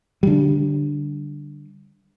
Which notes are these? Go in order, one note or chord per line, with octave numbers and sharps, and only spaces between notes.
D3 G3